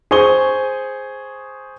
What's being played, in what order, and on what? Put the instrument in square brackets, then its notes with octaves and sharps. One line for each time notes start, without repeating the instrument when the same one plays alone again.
[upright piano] G#4 C5 C#6 D#6 G7